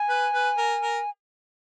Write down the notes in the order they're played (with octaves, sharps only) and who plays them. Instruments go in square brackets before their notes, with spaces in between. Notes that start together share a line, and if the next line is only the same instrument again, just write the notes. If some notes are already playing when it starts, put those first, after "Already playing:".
Already playing: [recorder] G#5
[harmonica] B4
B4
A#4
A#4